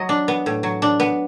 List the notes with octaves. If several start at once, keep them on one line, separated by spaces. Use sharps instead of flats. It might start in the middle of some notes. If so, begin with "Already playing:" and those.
Already playing: F#3 D#5
D4
B3
A2
F#3
D4
B3